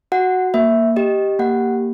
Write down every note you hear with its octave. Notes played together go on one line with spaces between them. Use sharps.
F#4 F#5
A#3 E5
G4 D#5
A#3 F#5